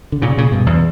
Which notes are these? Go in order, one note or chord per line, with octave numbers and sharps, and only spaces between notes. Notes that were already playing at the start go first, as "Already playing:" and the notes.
D3
A#2 C#3
A#2 C#3
G2 B2
E2